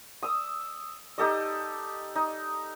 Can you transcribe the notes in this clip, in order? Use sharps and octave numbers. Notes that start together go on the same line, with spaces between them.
D#6 E6
D#4 G4 A4 D#5
D#4